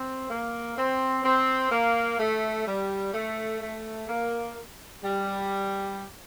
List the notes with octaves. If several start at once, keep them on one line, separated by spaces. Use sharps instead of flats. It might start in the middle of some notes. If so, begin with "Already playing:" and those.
Already playing: C4
A#3
C4
C4
A#3
A3
G3
A3
A3
A#3
G3